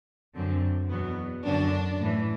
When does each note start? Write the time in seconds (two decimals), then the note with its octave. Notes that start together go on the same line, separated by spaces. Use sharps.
0.34 F#2 D3 F#3 C4
0.89 E2 B2 F#3 B3
1.45 F#2 D3 F#3 D4
2.00 A2 E3